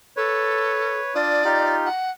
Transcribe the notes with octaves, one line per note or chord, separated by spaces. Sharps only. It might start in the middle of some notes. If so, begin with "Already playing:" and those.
A4 B4 C#5
D4 F4 D5 D#6
D#4 F4 G4
F#5